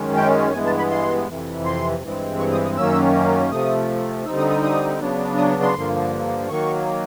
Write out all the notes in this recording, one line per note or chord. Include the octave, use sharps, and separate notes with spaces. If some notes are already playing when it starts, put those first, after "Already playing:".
Already playing: F#2 D#3 G#3 C#4
G5
G2 E3 G#3 B3 G#5
A5
B5
C6
F2 C3 E3
C6
G2 E3 G#3 C4
C#6
D#6
D#6
F#2 D#3 F#3 A#3 C#4 E6
C3 F3 A3 D#6
D3 G3 C4 D#4 E6
D#6
D#6
D#6
C#3 F#3 B3 D4
D#6
C6
G2 D3 F3 A#3
D#3 F#3 A#3 C#6